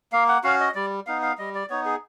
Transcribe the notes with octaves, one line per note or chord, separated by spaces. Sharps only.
A#3 F5
F#5
C#4 F#4 F5
D#5
G3 D5
B3 D#4 F5
F5
G3 D#5
D5
B3 D#4 C#5
G#4